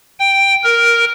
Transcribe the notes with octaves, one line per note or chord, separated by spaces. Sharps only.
G5
A#4